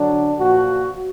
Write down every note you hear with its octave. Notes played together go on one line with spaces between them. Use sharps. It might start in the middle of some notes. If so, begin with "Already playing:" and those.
Already playing: D3 F#3 D4
A#2 F3 F#4